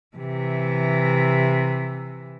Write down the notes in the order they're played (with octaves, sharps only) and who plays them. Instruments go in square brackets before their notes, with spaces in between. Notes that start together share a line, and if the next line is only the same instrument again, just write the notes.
[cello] C3 E3